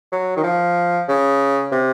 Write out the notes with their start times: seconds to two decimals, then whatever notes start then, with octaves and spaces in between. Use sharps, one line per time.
0.12 F#3
0.37 D#3
0.44 F3
1.08 C#3
1.72 C3